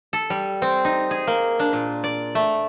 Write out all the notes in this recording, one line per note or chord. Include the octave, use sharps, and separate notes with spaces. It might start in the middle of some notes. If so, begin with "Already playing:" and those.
A4
G3
C4
D#4
G#4
A#3
D4
A#2
D5
A3